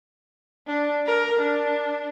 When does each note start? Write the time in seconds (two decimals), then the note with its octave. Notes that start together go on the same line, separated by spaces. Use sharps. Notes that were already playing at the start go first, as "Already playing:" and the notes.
0.67 D4
1.06 A#4
1.39 D4